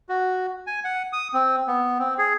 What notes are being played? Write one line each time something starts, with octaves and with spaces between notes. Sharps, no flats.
F#4
G#5
F#5
D#6
C4
B3
C4
G#4